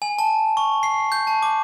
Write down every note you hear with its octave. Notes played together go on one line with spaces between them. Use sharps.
G#5
A5
C#6
C7
G6
A5
D6